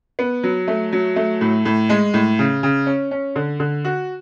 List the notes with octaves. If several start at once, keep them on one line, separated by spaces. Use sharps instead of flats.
B3
F#3
A3
F#3
A3
A2
A2
G#3
A2
C#3
C#3
C#4
C#4
D3
D3
F#4